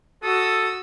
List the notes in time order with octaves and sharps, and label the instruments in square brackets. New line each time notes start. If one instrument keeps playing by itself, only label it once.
[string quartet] F#4 D#6 E6 [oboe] A4